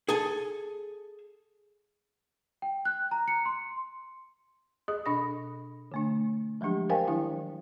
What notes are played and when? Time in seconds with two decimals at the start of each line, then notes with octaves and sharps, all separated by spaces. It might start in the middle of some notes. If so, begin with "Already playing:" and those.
0.09 G#4 A4 G#5
2.62 G5
2.85 F#6
3.11 A#5
3.28 C#7
3.46 C6
4.88 G#4 D#5 D#6
5.06 B2 D4 D#5 B5 D#6 A#6
5.92 D3 A3 D4
6.61 F3 F#3 G#3 D4 G4
6.90 A#4 C5 D#5 F5 G5 G#5
7.07 D#3 F#3 D4 E4